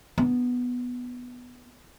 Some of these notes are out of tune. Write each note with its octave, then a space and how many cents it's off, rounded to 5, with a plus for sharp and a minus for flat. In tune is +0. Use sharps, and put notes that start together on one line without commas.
B3 +0 D4 +0